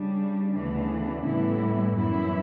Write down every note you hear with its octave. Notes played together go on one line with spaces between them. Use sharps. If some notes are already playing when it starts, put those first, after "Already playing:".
Already playing: C#3 G3 D4
D2 C#3 E3 B3 D4
A2 E3 G3 B3 E4
F#2 E3 B3 E4